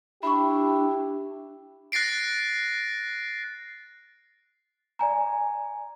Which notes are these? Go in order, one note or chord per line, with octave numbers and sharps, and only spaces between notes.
D4 E4 G4 B5 C#6
F#6 A6 A#6 C7 D7
D5 G#5 A#5